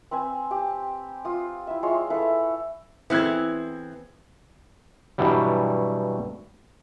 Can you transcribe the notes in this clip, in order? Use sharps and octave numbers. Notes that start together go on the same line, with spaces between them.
C4 B4 C5 G#5
G4
F4 D#6
E4 E5
G#3 F4 C#5 C6
E4 A4 B4 F5
E3 B3 C4 E4 G#4 A4 F#6 G#6
G2 B2 E3 F#3 G3